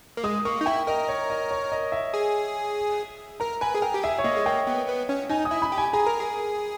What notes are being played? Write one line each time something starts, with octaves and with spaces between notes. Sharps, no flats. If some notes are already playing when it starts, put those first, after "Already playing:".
A#3
G#3 D#6
A#3 C#6
D#4
E4 G5
A#4 D#5
C#5
D#5
C#5
D#5
E5
G#4
A#4 A#5
B4 G#5
G#4
A#4 G5
G4
G#4 E5
C#5
A#3 D#5
G#3
A#3 G5
B3
B3
C#4
D#4 G#5
D#6
E4
B5
G4
G#5
G#4 A#5
A#4
G#4